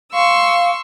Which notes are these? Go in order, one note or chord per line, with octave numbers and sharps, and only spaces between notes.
F5 C6 C#6 E6